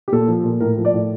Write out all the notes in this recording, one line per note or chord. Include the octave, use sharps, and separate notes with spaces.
G4
A#2 A4
F3
A#2
A2 A#4
F3
D5
A2